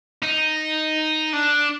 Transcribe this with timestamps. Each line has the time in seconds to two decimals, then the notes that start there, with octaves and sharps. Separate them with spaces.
0.23 D#4
1.34 D4